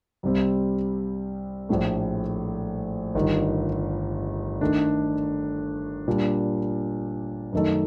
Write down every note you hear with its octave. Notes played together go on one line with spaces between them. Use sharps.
C2 C3 G3 C4
A#1 A2 A3
G1 G2 D#3
D#3 A3 D4
A#2 G3 D4
F#2 D#3 A3 D#4 A4